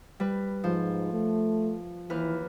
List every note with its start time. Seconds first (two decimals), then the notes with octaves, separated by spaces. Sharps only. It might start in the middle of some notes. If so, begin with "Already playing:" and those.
0.20 G3 B4
0.64 G#2 F3
1.13 A3
2.10 D#2 E3 B4 F6